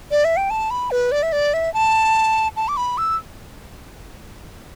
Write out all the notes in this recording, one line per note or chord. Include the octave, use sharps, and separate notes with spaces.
D5
E5
G5
A5
B5
B4
D5
E5
D5
E5
A5
A5
D6
B5
E6